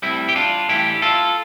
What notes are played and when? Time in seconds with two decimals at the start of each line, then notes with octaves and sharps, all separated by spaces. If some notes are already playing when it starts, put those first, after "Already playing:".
0.02 A2 G3 C4 E4
0.29 G4
0.36 D4 F4
0.69 A2 E3 G3 E4 G4
1.02 F4 A4